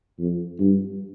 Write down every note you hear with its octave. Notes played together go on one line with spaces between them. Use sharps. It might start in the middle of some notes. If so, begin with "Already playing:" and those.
F2
G2